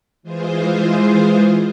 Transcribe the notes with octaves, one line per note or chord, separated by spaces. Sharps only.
E3 G#3 F4 G#4 C5